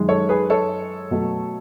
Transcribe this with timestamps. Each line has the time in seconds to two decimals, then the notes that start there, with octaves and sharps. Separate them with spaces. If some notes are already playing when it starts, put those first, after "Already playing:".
Already playing: F#2 D#3 G#3
0.09 A4 C#5
0.29 G#4 B4
0.50 A4 C#5
1.11 B2 F#3 A3